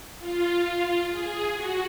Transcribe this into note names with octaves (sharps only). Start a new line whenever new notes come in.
F4
G#4
F#4